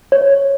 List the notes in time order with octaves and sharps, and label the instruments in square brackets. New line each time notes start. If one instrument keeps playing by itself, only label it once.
[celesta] C#5